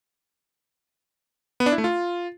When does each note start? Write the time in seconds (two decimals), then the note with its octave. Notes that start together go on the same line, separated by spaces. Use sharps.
1.60 B3
1.66 D4
1.72 E4
1.78 A3
1.84 F4